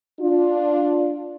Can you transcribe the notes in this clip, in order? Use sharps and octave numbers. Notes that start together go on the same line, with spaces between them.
D4 F4